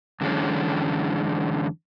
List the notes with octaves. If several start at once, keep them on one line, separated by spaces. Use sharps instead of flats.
F#2 D3 E3 F3 G#3 C#4